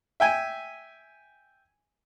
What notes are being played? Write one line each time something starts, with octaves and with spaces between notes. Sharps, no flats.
E5 G5 G#5